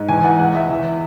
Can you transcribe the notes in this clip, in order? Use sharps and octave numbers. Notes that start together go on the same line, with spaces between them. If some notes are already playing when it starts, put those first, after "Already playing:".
Already playing: G#2
E2 G#5
E3 F#5
C#2 F#5
C#2 E5
E2